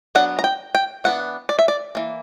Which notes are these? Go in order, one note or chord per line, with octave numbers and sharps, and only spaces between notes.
F#3 B3 D4 F#5
A#5
G5
G5
E3 B3 D4 F#5
D5
E5
D5
E3 A#3